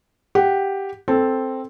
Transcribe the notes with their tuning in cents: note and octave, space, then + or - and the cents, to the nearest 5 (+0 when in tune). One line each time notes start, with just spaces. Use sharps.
G4 +0 F#5 +10
C4 +0 A4 +0